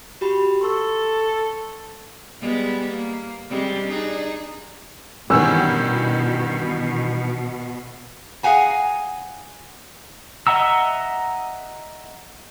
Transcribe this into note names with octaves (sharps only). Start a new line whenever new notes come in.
F#4 G4 B5
A4 C6 C#6 E6
G3 G#3 B3
A#3
G3 G#3 C4
D4 D#4 G#4
G2 B2 D#3 E3 B3 C#4 E6
G#4 F5 F#5 G#5 A#5
D#5 E5 F#5 A#5 E6